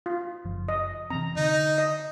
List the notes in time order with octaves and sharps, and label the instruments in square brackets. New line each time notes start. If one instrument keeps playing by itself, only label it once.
[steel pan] F4
[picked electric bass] F#1 F3
[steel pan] D#5
[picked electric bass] C3 E3 C4 [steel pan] A#5
[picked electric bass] D3 [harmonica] D#4
[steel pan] D#5